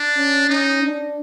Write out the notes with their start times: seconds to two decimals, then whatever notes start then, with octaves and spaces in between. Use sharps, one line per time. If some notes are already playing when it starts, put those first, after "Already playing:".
Already playing: D4
0.16 C#4
0.49 C#4 D#4
0.82 D4